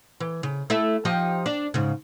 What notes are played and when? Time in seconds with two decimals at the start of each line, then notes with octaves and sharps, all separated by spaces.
0.20 E3
0.43 C#3
0.70 A3 E4 E5
1.05 F3 D#4 G4
1.46 D4
1.74 G#2 C#3